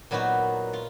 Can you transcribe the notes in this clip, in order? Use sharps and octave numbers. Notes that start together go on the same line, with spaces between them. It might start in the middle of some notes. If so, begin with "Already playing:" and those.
A#2 F#3 B3 D#4 F#4
F4